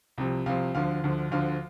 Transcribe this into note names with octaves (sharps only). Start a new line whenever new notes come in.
C2 C3 F3
C2 C3 F3 F5
D2 D3 F3 F5
D2 D3 F3
D2 D3 F3 F5